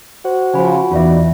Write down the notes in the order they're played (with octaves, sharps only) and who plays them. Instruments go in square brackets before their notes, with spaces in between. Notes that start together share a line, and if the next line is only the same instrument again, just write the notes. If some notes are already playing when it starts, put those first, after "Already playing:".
[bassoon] F#4 [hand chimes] C5
[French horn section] C#3 F3 [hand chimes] G#5 B5
[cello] E2 [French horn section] B2 D#4 D5 [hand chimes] F4 E5